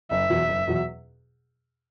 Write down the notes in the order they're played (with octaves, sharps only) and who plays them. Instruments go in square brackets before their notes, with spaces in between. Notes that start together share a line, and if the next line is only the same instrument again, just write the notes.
[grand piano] F#1 [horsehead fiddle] E5
[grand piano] E2 B2 F#3
F#1
E2 B2 F#3